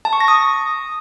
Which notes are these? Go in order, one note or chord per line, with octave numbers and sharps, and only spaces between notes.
A5
C#6
A#6
D#6